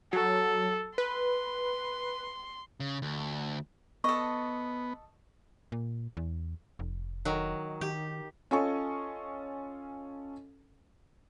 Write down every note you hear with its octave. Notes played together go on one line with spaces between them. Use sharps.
F#3 A4
B4 C6
C#3
D2
B3 A4 D#5 C#6
A#2
E2
F1
D#3 F#3
D#3 G4
C#4 F4 A4 D#5 G#5 C#6